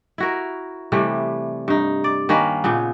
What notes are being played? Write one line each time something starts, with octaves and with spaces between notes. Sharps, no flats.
E4 F#4 A#4
C3 E3 G3 A3
G2 D#4
D5
D#3 A#3 C#4 B4
A#2 C#3 B3